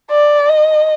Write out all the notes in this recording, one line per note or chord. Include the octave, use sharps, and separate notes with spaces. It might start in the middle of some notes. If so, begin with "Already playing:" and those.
D5
D#5